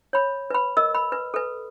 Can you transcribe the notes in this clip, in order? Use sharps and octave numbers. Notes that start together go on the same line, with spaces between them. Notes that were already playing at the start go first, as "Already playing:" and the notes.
C#5 B5
B4 B5
A#4 D#5 E6
B5
B4
A4 B4